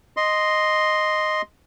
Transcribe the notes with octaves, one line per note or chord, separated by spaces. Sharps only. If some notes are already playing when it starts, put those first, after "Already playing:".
D#5 C6